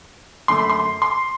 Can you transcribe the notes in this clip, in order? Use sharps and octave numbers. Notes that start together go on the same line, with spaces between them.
F#2 D3 A3 C6
B5
C6
C6